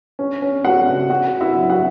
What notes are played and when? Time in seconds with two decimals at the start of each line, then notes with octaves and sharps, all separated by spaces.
0.19 C#4
0.42 C#4
0.65 A3 F#4 F#5
0.87 C#3
1.10 C#4 F#4 F#5
1.33 C#4
1.41 E4 E5
1.55 F#3
1.70 F#4 F#5